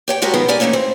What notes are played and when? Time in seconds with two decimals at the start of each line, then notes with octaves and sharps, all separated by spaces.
0.08 G4 C#5 G5
0.22 G#3 F#4 G4 A4 A#4 C#5
0.33 B2 D#3 F3 G#3 B3
0.48 G4 A#4 D5 G#5
0.60 E3 A3 A#3 C#4 D#4
0.73 C4